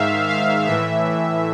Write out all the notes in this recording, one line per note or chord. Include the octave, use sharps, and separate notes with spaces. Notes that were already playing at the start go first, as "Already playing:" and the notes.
Already playing: G#2 D#3 E5 F5
F5
A2 E3 E5